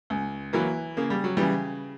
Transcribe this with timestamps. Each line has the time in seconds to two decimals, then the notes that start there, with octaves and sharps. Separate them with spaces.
0.10 C#2
0.53 E3 F#3 A#3
0.97 C#3 A#3
1.10 G3
1.24 F#3
1.37 C#3 E3 G3